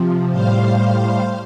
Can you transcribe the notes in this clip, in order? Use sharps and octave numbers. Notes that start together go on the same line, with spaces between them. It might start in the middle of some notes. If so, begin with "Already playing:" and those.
Already playing: C3 F3
A2 G3 C5 F5